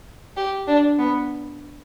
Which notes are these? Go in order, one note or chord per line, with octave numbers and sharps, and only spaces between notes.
G4
D4
B3